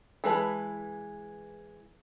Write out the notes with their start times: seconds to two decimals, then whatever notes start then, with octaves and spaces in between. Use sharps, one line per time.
0.24 E3 G#3 B4 A5